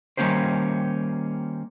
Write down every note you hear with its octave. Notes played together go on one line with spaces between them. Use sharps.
D#3 G3 A#3 C#4 G4 C5